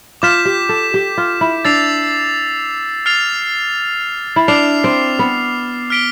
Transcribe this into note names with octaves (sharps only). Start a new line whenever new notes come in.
F4 D6 G6 B6 E7
G4
A4
G4
F4
E4
D4 E6 A6 C7 F7
F6 A6 C7 F7
E4
D4 D6 F6 C7 F7
C4
B3
F6 B6 D7 G7